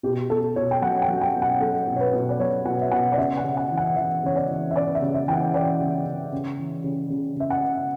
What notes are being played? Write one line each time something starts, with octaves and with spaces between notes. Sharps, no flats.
B2 G4
B2 A4
B2 C#5
G5
F#3 F#5
G5
F#3
G5
B2
F#5
F#3 A4
B2
C#5
B4
B2
D5
F#3 C#5
B2 F#5
E5
B2 F#5
D5
C#3 E5
F#5
C#3
F#5
E3
F#5
E3 E5
C#3 C#5
D5
E3
E5
C#3 D5
E5
C#3
E5
E3 G5
F#5
E3 D5
C#3
C#3
C#3
E3
C#3
C#3
C#3 E5
F#5
C#3